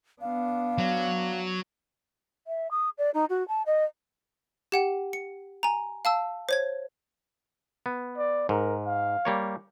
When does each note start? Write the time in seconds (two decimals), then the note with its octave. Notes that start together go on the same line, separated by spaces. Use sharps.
0.21 B3 D4 F5
0.78 F#3
2.47 E5
2.71 D#6
2.98 D5
3.14 D#4
3.30 F#4
3.48 A5
3.66 D#5
4.72 G4 F#5 G5
5.13 C#7
5.63 G#5 A#5
6.05 F5 A5 E6
6.49 C5 C#5 G#6
7.86 B3
8.17 D5
8.49 G#2 A#4
8.86 F5
9.25 G3 A#3 C#5